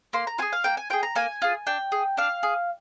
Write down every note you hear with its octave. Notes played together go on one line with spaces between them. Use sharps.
A#3 C6
A#5
F4 G#4 G#5
F5
A#3 G5
G#5
F4 G#4 G5
A#5
A#3 G#5
F4 G#4
D4 G5
G#4
D4 F5
G#4